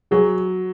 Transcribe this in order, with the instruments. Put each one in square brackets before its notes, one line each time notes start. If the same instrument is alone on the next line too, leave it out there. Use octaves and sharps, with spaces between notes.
[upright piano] F#3 [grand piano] G#4